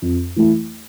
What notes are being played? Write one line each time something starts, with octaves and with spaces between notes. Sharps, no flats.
F2
E3 A3 E4